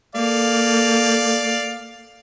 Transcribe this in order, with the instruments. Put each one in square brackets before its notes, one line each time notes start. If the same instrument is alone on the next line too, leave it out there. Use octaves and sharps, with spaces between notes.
[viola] A#3 A4 [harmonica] D5 F5